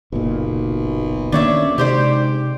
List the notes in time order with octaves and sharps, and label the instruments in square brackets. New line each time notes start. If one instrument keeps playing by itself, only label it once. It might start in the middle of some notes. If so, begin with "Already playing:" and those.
[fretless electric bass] F#1 A#2 [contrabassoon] B1
[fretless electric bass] D#3 A#3 C#4 [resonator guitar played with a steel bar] D4 C#5 E5
[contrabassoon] G#2 [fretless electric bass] C3 [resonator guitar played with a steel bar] G4 C5 D5